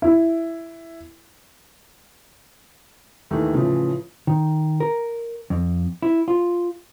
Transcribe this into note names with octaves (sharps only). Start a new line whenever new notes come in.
E4
D#2 D#3 E3 A3
A2 C#3 E3 F3
D#3
A#4
F2
E4
F4